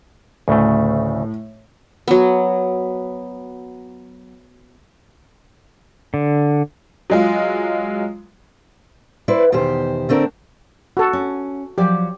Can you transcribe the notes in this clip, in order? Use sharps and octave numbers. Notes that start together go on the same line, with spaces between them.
D2 A2 C#3 A3
F#3 B3
D3
F#3 G#3 F4
E4 B4 C5 D5
E2 B2 D#3 G4 C5
D3 A3 C4 D4 A#4
F#4 A4
C#4
F3 F#3 G4 D5